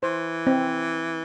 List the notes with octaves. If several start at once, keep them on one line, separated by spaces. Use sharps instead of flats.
E3 C5
C4